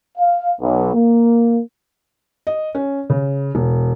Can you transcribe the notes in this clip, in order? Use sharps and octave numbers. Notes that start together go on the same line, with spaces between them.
F5
B1
A#3
D#5
C#4
C#3
E1